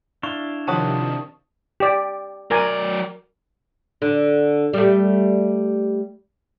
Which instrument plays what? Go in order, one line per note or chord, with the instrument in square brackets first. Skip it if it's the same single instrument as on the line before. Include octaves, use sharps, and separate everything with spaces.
[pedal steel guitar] D4 E4 F5 [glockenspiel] C#6
[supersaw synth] C3 D#3 F3 [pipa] G4 C#5 F#5 [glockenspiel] A5 D#6
[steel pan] G4 D5
[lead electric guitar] F#3 D5 [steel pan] A#4 G#5
[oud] D3
G3 A3